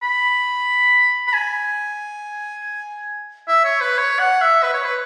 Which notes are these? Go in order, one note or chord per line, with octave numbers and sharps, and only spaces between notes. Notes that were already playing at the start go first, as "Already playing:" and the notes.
B5
B5
G#5
E5
C#5
B4
C#5
F#5
E5
B4
C#5
B4